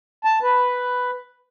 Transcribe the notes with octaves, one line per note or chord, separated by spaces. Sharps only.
A5
B4